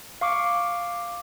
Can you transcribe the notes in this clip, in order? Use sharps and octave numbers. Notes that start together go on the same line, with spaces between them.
F5 C#6 D6